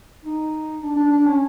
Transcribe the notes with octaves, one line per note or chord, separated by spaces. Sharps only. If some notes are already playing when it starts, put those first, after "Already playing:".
D#4
D4
D4
D4
C#4